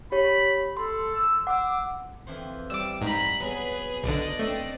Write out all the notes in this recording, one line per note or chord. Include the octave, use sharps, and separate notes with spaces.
G4 C#5 B5
A4 C6
E6
F#5 D6 E6
F2 E3 C5
G3 D5 D6 E6
G#2 A#5 B5
F#3 B3 G#4 B4
B1 D3 D5 D#5
A3 C4 D4